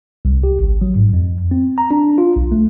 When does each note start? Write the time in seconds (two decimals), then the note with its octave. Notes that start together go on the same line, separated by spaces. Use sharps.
0.25 C2
0.43 G4
0.59 G#1
0.81 F#3
0.96 G#2
1.13 F2
1.51 C4
1.78 A#5
1.91 D4
2.18 F4
2.36 B1
2.52 A3